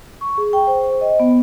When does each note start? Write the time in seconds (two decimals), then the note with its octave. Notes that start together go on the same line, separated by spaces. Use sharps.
0.21 C#6
0.38 G#4
0.53 G5
0.67 C5
1.01 D#5
1.20 B3